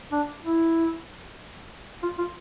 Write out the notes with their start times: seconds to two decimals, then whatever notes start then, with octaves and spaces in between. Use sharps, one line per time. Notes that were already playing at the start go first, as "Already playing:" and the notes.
0.12 D4
0.44 E4
2.03 F4
2.18 F4